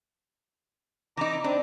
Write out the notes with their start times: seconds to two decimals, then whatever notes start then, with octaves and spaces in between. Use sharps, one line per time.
1.17 E3 D#4 A#5 D6
1.44 C4 D4